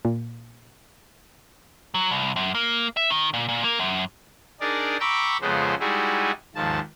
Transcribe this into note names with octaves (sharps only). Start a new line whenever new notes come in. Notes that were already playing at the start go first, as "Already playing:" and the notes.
A#2
F#3
C2
F#2
A#3
E5
D#3
A#2
A#2
A#3
F#2
D4 D#4 G#4 A#4 D5
G5 A#5 B5 C#6 D6 E6
F2 C#3 F3 G#3 B3 C5
G3 G#3 D#4 E4 F#4 G#4
D#2 G#2 D#3 F3 A5